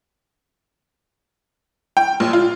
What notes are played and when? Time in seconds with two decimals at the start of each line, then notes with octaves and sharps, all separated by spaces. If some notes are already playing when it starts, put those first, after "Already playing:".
1.97 G5
2.20 A#1
2.33 F4